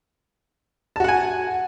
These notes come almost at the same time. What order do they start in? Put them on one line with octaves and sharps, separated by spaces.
A5 F#4 F#5 G#5